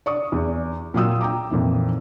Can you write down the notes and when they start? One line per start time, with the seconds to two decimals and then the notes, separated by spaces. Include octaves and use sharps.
0.06 D5 C#6 D#6
0.32 E2
0.94 A#2 F#3 F4 G5 D#6 E6
1.21 G5 A#5 D6
1.50 F2 A#2 E3 D#4